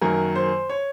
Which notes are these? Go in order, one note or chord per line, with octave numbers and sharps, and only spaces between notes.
F#2 D#3 F#3 A#3 A#4
C5
C#5